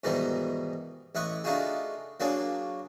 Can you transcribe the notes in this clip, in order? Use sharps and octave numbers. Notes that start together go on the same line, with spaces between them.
G#2 B2 D#3 E3 G3 D#4
A1 E4 D#5 F#5 C#6
A3 D4 D#4 F4 F#4 G#4
F#3 A#3 D4 G#4 C#5 D5